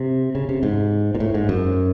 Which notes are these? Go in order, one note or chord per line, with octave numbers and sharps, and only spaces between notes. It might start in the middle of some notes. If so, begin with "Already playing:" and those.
Already playing: C3
C#3
C3
G#2
A#2
A2
G#2
F#2